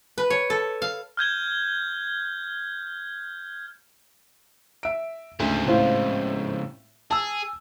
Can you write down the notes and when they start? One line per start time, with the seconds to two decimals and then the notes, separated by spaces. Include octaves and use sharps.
0.18 B4
0.30 C#5
0.50 A4
0.82 F5
1.17 F6 G6 G#6 G7
4.83 E5 D7
5.40 D2 G#2 C#3
5.67 A2 C4 F4
7.11 G#4 A5 E6